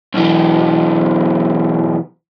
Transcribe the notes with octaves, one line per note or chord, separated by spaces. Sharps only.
B1 E3